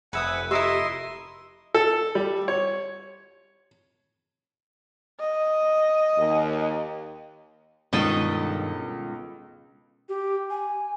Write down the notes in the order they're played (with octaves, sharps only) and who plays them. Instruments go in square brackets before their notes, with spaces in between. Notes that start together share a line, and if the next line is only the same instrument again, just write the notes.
[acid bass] F1 [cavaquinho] B4 E5 D#6 [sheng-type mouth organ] F#5 G#5
[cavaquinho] E4 A#4 E5 [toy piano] G4 [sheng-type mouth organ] D#5 C6
[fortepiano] A4
G3
C#5
[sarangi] D#5
[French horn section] D#2
[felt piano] C#2 [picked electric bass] G2 D#3 [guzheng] B2 A4 D#5
[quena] G4
G#5